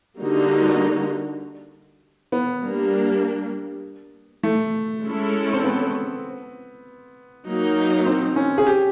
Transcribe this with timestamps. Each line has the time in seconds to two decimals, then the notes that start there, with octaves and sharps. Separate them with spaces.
0.21 D3 G3 A#3 D#4 F#4
2.32 B3
2.62 G3 A#3 D4
4.43 A3
5.04 G#3 C#4 E4 A4
5.53 C4
5.64 B3
7.46 F#3 A#3 D#4
8.06 C4
8.36 C#4
8.58 G#4
8.67 G4